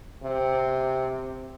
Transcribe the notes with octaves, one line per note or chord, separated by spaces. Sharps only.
C3